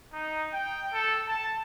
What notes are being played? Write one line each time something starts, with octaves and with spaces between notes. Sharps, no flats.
D#4
G5
A4
A5